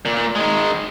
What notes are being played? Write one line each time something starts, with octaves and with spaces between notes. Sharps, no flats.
A#2
D#3 G#3